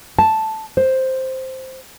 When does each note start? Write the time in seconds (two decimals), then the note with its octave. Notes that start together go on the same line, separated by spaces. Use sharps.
0.19 A5
0.77 C5